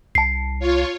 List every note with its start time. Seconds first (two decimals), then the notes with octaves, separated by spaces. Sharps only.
0.15 C2 A5 C7
0.59 F4 C#5